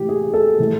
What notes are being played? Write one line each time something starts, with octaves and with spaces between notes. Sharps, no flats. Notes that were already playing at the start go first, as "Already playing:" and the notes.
Already playing: A2 E3 G#3 G4
G#4
A4
A2 E3 G#3